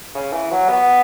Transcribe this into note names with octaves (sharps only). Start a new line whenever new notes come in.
C#3
E3
F#3
B3